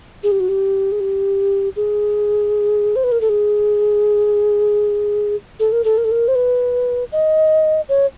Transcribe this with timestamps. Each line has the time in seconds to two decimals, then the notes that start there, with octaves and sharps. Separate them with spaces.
0.23 G#4
0.31 G4
0.40 F#4
0.49 G4
0.92 G#4
1.00 G4
1.76 G#4
2.96 C5
3.04 B4
3.12 A#4
3.21 A4
3.29 G#4
5.60 A4
5.72 A#4
5.84 A4
5.97 A#4
6.04 A4
6.11 A#4
6.28 C5
6.35 B4
7.12 D#5
7.89 C#5